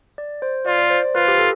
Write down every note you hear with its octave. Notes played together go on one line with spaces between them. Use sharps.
D5
C5
F4 D5
D5
C5
C5
F4 B4
G4
A4